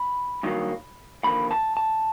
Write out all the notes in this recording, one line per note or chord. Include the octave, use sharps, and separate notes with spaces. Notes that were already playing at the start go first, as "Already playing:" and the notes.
Already playing: B5
G2 D#3 F#3 A#3
D#2 D3 F3 A#3 B5
A5
A5